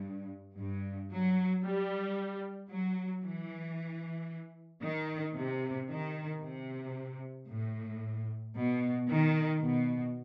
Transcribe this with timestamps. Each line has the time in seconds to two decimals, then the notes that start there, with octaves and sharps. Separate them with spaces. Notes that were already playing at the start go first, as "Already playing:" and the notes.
Already playing: G2
0.58 G2
1.11 F#3
1.64 G3
2.70 F#3
3.24 E3
4.83 D#3
5.36 C3
5.89 D#3
6.42 C3
7.49 A2
8.55 B2
9.09 D#3
9.61 B2